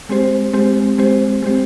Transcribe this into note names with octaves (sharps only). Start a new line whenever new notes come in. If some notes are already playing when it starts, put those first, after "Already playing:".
G#3 C4 G4 C5
G#3 C4 G4 C5
G#3 C4 G4 C5
G#3 C4 G4 C5